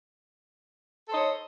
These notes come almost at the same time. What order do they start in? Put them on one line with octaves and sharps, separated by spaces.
A4 C5 D#5 C#5